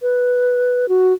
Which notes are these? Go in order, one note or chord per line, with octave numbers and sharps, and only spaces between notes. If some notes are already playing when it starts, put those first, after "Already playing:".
B4
F#4